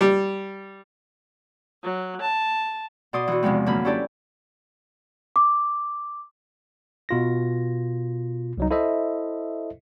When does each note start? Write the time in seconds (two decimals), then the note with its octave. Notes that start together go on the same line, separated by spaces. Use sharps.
0.01 G3
1.83 F#3
2.22 A5
3.13 B2 D5 C6 D#6
3.27 E3 F#4
3.43 E2 C3 F3 G#3 B3 C4
3.66 F#2 D3 A#3 B5
3.85 C#4 D4 E4 G4 A4 D5
5.36 D6
7.09 B2 F4 A#6
8.58 C2 F#3 D#4
8.71 E4 A4 C5 D#5 E5